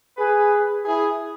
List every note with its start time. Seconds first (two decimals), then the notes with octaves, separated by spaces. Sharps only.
0.18 G#4 B4
0.85 E4 G#4